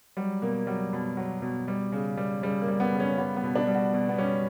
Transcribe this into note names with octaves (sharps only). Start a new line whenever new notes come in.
F#3 G3
B2 A#3
F#3 G3
B2
F#3
B2
G3
C#3
G3
C#3 G3
A#3
G3
B3
C#3
C#4
G3 B3
B3
B2
D4
G3
F#4
B2
B3
G3 C#4